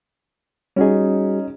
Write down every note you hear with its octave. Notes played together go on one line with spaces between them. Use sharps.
G3 C#4 D#4 F#4 G#4